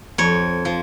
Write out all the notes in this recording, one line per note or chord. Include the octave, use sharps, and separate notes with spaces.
F2 C#5
F3